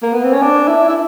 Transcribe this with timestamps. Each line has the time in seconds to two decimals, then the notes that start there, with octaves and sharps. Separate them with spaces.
0.02 A#3
0.13 B3
0.23 C4
0.33 C#4
0.42 D4
0.68 E4
0.89 E4